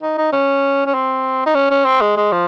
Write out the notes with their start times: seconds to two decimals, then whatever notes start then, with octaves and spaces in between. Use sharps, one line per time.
0.03 D#4
0.18 D#4
0.32 C#4
0.86 C#4
0.94 C4
1.46 D#4
1.55 C#4
1.71 C#4
1.85 C4
2.01 G#3
2.17 G#3
2.32 F3